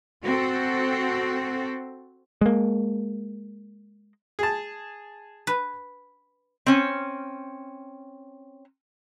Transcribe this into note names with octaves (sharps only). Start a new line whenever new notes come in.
C4 F#4 A4
G#3 A#3
G#4 A5
B4
C4 C#4